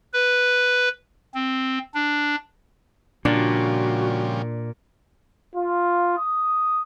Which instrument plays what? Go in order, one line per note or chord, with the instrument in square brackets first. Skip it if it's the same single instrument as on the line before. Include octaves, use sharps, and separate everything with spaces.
[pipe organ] B4
C4
D4
[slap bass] A#2 [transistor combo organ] C#3 F3 G3 [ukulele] D4 [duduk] F#4
[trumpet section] F4
D#6